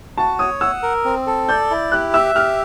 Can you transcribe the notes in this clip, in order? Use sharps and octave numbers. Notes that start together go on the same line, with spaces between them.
F#4 A5
C#5 D#6
F#5 E6
A#4
C4
A4
D5 G6
E4
G4 F#6
E5 E6
G4 F6